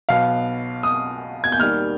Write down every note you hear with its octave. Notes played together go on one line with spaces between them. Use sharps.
B1 B2 B3 F5
D#6
G#6
G6
D#2 D#3 G3 F6